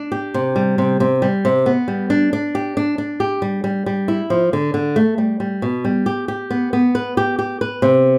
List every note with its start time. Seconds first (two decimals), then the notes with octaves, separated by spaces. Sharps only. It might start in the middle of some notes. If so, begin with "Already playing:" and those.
Already playing: D4
0.12 G4
0.34 C3
0.56 G3
0.78 C3
1.00 C3
1.22 G3
1.45 C3
1.66 B3
1.88 G3
2.10 D4
2.33 D4
2.55 G4
2.77 D4
2.98 D4
3.20 G4
3.42 G3
3.64 G3
3.86 G3
4.08 E4
4.30 F3
4.53 D3
4.74 D3
4.96 A3
5.18 G3
5.40 G3
5.62 B2
5.85 G3
6.06 G4
6.28 G4
6.50 B3
6.73 B3
6.95 B4
7.17 G4
7.39 G4
7.61 B4
7.82 C3